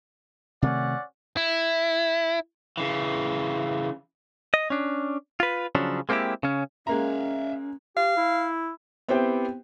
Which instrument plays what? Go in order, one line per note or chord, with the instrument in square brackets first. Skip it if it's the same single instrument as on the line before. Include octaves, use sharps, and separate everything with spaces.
[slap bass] C3 D#3 A3 [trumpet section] C#4 D5 F#5
[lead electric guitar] E4
[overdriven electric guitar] C#3 E3
[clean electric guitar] D#5
C#4 D4
F4 B4
C#3 F3 F#3 C#4 D4
G#3 A#3 C4 C#4 E4 G4
C#3 C#4
[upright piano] G#3 A#3 A#5 [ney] C#4 [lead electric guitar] E5 F5
[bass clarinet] G4 [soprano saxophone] F5
[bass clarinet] E4
[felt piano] B3 C4 E4 G4 C5 G5